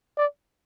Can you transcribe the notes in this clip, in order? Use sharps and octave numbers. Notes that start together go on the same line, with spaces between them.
D5